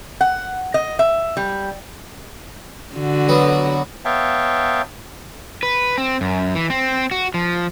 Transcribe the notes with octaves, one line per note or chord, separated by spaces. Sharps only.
F#5
D#5
E5
G3
D3 F#4
F#3 B3
B3 C#5 E5 F5 G5 A5
B4
C4
F#2
E3
C4
F#4
F3